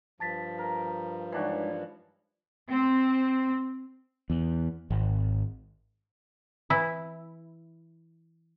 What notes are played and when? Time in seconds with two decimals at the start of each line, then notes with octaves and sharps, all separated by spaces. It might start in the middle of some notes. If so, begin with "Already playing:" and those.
0.20 G2 F3 A5 A6 B6
0.58 A#4
1.32 E3 G#3 D4 D#4 F#4 C#5
2.70 C4
4.30 E2
4.91 G#1
6.70 E3 E4